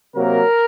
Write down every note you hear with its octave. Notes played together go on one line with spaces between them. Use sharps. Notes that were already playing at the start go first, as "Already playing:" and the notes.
C3 F#3 A#3 A#4